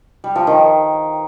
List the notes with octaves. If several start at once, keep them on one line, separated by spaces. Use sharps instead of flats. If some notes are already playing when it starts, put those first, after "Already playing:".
G3
F3
D#3